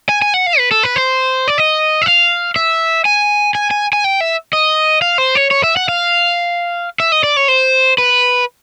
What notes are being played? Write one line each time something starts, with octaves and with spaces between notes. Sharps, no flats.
G#5
G#5
F#5
F5
B4
A4
B4
C5
D5
D#5
E5
F5
E5
G#5
G#5
G#5
G#5
G5
E5
D#5
F5
C5
C#5
C#5
E5
F#5
F5
E5
D#5
D5
C#5
C5
B4